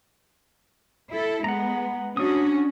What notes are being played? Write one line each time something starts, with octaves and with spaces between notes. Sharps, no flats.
E4 A4
G#3 B3 F#5 A#5
C#4 D4 F#4 D#6